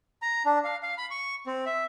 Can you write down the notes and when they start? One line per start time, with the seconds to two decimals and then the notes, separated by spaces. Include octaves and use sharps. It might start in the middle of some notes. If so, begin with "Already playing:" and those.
0.22 A#5
0.46 D4
0.64 F5
0.83 F5
0.98 B5
1.11 C#6
1.47 C4
1.66 E5